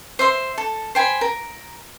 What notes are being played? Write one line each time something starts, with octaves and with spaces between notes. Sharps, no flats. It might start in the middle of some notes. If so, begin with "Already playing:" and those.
C5 E5 C6
A4
C5 G5 G#5 B5
A#4